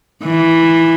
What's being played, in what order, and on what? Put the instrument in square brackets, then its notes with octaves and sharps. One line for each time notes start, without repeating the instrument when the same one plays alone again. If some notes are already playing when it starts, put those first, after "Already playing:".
[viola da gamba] E3